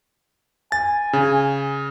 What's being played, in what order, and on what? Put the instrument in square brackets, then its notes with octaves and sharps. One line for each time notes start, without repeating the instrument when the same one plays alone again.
[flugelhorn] G#5 [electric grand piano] A6
[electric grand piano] C#3